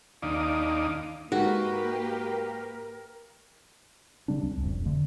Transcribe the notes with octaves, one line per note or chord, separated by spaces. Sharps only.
D#2 D4 D#4 F5 D6 D#6
G#2 A#3 F#4 G4 A#4 B4
C#3 G3 C4 D4
C#2
E1 F2
D3 A3